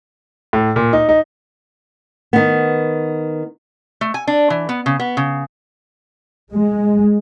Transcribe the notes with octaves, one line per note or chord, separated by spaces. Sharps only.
A2
A#2
D#4
D#4
D#3 B3
A3
G#5
D4
E3
B3
C#3
B3
C#3
G#3